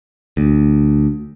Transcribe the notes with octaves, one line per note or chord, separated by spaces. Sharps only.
D2